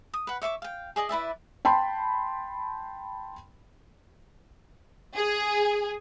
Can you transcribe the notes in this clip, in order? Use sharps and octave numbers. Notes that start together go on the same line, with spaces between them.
D#6
B4 F#5
C#5 E5 C#6 D6
F5 G5
G#4 D5 D#5 G#5
E4 B4 D5 E5
G5 A5 B5 C6
G#4